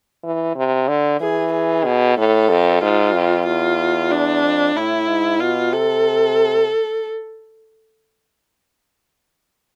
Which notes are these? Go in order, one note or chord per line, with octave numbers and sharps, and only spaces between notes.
E3
C3
D3
E3 G#4
G#4
B2
A2 A4
F2
G#2 F4
F2
E2 F4
D4
F2
A2 E4
G#2
B2 F4
C3 A4